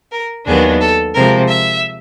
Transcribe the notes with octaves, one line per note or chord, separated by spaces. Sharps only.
A#4
D#2 D#3 F#3 B3 D4 G#4
A4
C3 F3 G#3 C4 A#4
E5